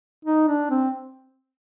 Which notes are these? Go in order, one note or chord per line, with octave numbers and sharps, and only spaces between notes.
D#4
D4
C4